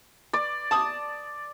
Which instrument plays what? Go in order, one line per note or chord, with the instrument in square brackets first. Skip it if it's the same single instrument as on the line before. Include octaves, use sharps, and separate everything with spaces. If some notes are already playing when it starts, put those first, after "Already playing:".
[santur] D5
[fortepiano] A5 D#6